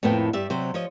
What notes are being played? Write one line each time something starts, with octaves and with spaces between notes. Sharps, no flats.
F2 A2 A#3 B3 E4 G5
G2 G4 D5 E5
C3 F#3 C5
F3 C#5 D#5